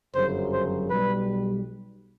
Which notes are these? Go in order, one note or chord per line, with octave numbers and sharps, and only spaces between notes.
G1 F#2 C#3 F#3 C5
C5
B1 B2 G3 B4